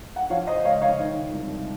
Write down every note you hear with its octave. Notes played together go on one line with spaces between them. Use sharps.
F#5
F3 C#5 F5
C5 D#5
C#2 C#5 F5
C#5 F5
D#3
C2